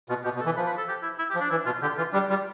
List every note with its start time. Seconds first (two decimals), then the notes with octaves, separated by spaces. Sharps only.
0.09 B2 F4
0.24 B2 G4
0.35 B2
0.40 A4
0.45 E3
0.56 F3 B4
0.67 B4
0.77 A4
0.88 G4
1.03 E4
1.18 E4
1.30 G4
1.35 F3
1.40 D4
1.50 E3 E4
1.66 B2 F4
1.82 D3 G4
1.98 E3 F4
2.13 G3 D4
2.29 G3 F4